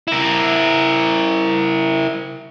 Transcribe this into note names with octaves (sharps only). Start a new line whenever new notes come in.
E4 A#4